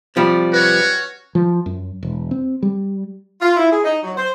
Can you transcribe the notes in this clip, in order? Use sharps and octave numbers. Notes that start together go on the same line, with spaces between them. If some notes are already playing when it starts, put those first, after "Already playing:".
C3 F3 G3
C#4 F#4 B4 C#5
F3
F#2
E1
C4
G3
F4
E4
G#4
D#4
F#3
C5